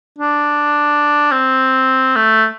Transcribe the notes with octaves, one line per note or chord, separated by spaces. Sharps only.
D4
C4
A3